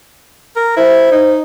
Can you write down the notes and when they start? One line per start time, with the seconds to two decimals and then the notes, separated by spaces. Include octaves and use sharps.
0.56 A#4
0.77 E4 C5
1.11 D#4